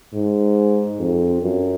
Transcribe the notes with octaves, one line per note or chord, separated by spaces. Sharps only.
G#2
F2
F#2